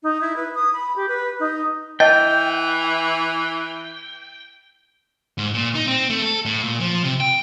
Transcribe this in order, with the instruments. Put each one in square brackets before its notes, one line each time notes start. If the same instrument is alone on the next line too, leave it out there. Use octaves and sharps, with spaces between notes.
[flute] D#4
E4
B4
D#6
B5
G4
B4
D#4
[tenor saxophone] E3 [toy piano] D#5 A5 [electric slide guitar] G5
[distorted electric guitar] G#2
A#2
D#4
C4
A3
A4
A2
A#2
F3
C3
G5